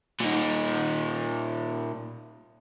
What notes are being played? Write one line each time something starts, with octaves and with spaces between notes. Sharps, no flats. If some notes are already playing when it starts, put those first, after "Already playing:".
A#2 D#4